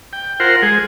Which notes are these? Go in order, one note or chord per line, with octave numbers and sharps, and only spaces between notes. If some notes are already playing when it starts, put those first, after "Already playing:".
G5
F4 A#4 C5 F#5
G#3 G#4